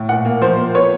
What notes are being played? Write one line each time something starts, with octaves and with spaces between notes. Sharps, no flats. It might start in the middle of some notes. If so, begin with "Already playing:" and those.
Already playing: A2
A#2 F#5
A#3
F3 C5
A#3
B3 C#5